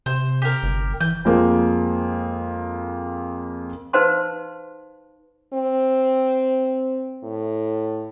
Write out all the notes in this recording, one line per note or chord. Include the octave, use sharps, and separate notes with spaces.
C3 C5
G4 A#4
G1
E3 G6
F2 G#3 A#3 F4
D#4 B4 C5 F5 A5 C6
C4
A2